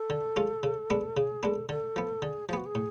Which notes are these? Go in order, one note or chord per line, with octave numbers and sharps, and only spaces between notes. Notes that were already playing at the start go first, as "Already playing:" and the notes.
Already playing: A4
D3
G#3 C#4 F4
C#3
G#3 B3 D4
C#3 G#4
G#3 B3 D4 A4 B4
D3 A4
F3 B3
D3 G#4
F3 B3 F#4 G#4
G#4
A2